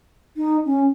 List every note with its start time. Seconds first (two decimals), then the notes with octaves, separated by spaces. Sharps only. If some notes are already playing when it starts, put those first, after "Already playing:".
0.36 D#4
0.65 C#4